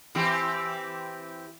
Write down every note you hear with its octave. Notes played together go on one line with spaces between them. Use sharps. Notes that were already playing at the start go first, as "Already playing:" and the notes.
E3 C4 G4